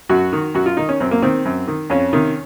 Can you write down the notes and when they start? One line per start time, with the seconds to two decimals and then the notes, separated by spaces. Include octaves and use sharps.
0.09 F#2 F#4
0.33 D#3
0.54 F#2 F#4
0.66 F4
0.77 D#3 D#4
0.89 C#4
1.00 F#2 C4
1.11 A#3
1.22 D#3 C4
1.45 F#2
1.68 D#3
1.90 F2 C#4
2.13 C3 D#3